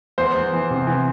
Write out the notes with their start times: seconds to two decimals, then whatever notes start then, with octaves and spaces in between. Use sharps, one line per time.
0.18 E2 C5
0.35 E2
0.53 E3
0.70 C3
0.87 E3